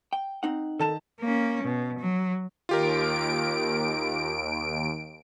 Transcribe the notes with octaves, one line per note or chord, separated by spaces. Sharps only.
G5
C4 D#4 F#5
D#3 A4 A5 E7
A#3 C#4
B2
F#3
D#2 F4 G4 A#4 D7